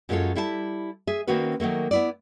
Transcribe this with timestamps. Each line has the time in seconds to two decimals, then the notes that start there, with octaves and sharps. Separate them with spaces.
0.09 F#2 F#3 G#3 D4 F4 A4
0.36 G3 E4 E5 F#5 A5
1.07 G#4 E5 G#5
1.27 D#3 A#3 C4 C#4 F#4 B4
1.60 D#3 F#3 A3 A#3
1.91 B3 E4 D5